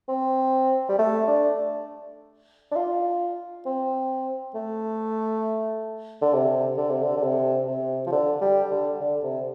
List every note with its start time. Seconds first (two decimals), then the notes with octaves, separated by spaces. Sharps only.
0.09 C4
0.89 G3
0.99 A3
1.27 D4
2.72 D4
2.76 F4
3.66 C4
4.55 A3
6.22 D3
6.34 C3
6.77 D3
6.90 C3
7.03 D3
7.17 D3
7.23 C3
7.68 C3
8.06 F3
8.12 D3
8.41 G3
8.71 D3
9.01 D3
9.23 C3